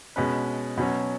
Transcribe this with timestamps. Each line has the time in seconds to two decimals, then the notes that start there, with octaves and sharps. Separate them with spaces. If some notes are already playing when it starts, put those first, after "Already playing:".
0.16 B2 G#3 C#4 B4
0.77 B2 F#3 C#4